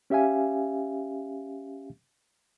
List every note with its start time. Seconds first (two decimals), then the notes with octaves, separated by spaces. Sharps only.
0.10 C#4 G4 E5 F5 G#5